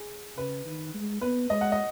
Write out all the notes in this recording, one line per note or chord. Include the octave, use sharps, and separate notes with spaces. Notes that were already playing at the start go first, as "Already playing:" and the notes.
Already playing: G#4
C#3 B4
D#3
G#3
B3 B4
G#3 D#5
F#5
D#5